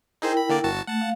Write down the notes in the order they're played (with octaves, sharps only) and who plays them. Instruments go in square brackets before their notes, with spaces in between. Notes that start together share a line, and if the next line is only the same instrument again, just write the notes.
[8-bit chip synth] D#4 G#4 C5 [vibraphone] E4 A#4 G5
[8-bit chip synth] B5
D3 A#3 D5
G1 F#4 A5
[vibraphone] A3 [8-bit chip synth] F#5 A5
[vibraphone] F5